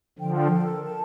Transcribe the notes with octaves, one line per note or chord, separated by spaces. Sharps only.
D3 F3 G5
G5
A4
A#4
A5